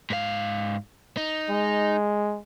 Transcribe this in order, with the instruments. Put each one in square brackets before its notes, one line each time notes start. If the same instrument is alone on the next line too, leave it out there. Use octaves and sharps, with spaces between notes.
[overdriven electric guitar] G#2 F5
D#4
[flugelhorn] G#3